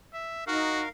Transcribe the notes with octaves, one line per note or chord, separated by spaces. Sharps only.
E5
D#4 F#4 A#4 F5